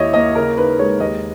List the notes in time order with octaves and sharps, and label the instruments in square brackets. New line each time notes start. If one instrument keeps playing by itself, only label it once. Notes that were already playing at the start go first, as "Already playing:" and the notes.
Already playing: [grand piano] D#2 E4 C#5 D#5 E5
A#3 D#5
C#3 A#4
D#4 B4
G#3 C#5
D#2 D#5